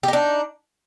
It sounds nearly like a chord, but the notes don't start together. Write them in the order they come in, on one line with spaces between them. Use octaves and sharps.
G4 D#4 D4